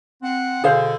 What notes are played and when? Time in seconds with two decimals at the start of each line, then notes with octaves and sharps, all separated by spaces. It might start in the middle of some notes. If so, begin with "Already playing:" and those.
0.22 C4 F#5
0.64 B2 D3 G#4 C5 F5